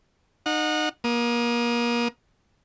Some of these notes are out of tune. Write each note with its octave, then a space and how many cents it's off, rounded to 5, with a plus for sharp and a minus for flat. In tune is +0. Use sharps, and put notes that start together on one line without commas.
D#4 -25 F#5 -25
A#3 +35 D#6 +0